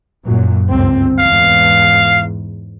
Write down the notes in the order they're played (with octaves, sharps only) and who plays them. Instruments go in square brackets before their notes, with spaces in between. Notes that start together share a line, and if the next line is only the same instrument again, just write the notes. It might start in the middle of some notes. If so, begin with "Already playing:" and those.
[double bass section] F#2 A#2 F#3
G1 C#2 C4
[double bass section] E2 G#2 [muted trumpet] F5